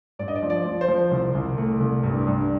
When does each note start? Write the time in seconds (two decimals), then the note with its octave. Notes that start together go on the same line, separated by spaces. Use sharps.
0.19 G2 D5
0.28 D#5
0.35 D5
0.43 F3
0.50 D5
0.65 F3
0.81 C5
0.88 F3
1.11 C2
1.35 C2
1.58 A3
1.80 C2
2.03 G2
2.27 G2